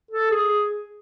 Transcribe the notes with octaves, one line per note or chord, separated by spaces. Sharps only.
A4
G#4